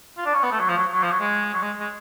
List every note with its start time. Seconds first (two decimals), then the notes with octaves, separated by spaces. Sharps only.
0.17 F4
0.25 D4
0.34 C#4
0.43 B3
0.51 A3
0.60 F#3
0.69 F3
0.77 F#3
0.94 F#3
1.03 F3
1.11 F#3
1.20 G#3
1.54 F#3
1.62 G#3
1.80 G#3